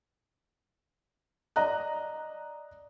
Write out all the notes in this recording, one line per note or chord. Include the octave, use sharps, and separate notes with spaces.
D5 D#5 A#5 F#6